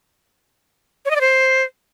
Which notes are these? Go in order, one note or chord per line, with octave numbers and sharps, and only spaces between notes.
C#5
D#5
D5
C5